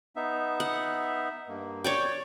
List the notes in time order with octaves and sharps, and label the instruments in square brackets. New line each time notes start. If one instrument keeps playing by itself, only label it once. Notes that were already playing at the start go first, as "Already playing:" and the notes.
[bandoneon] B3 D#4 E5
[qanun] F#5
[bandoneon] G2 A#3
[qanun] C#5 D5 G5